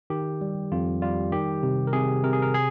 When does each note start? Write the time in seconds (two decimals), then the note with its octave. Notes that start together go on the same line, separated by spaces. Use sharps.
0.10 D#3 G4
0.41 G3
0.72 F2 F4
1.02 G3 F4
1.32 D#3 G4
1.63 C3
1.87 A#4
1.93 C3 G#4
2.24 C3 A#4
2.33 G#4
2.42 A#4
2.54 G#4